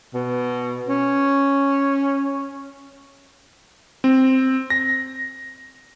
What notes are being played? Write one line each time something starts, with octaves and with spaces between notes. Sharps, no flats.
B2
C#4
C4
A#6